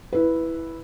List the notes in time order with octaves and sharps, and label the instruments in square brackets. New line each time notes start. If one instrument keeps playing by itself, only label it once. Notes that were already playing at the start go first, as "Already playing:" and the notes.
[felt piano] E4 B4